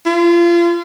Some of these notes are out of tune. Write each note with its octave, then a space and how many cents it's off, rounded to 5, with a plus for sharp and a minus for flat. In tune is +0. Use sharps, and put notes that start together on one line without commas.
F4 -30